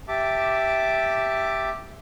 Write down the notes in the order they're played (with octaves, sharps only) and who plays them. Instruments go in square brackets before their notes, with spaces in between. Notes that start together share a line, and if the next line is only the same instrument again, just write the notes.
[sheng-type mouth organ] G4 E5 A5 D6